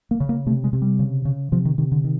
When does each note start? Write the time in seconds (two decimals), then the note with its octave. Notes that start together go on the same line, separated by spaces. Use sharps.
0.11 A#3
0.20 C#3
0.29 A#3
0.46 C3 A3
0.64 G#3
0.73 C3
0.82 G3
0.99 C#3
1.25 C#3
1.52 C3 F3
1.65 D#3
1.78 C3 D#3
1.92 D3
2.04 D#3